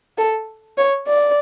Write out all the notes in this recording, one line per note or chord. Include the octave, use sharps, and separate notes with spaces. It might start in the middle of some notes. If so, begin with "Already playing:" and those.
A4
C#5
D5